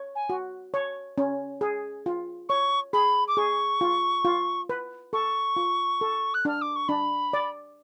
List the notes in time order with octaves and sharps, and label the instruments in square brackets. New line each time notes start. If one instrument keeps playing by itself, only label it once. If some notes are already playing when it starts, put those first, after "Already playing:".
Already playing: [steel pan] C#5
[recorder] G#5
[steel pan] F#4
C#5
C#4
G#4
F4
[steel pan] C#5 [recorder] C#6
[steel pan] G#4 [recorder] B5
[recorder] D6
[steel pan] G#4 [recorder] C#6
[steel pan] F4
F4
B4
[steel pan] A4 [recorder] C#6
[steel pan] F4
A4
[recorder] F#6
[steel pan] D4 [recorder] F6
[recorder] D6
C#6
[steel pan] D4 [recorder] B5
[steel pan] D5